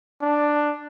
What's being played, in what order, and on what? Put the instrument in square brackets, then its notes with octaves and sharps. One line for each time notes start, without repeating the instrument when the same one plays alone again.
[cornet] D4